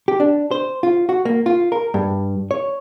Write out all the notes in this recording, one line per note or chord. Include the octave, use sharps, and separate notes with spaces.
G4
D4
C5
F4
F#4
A#3
F4
A#4
G2
C#5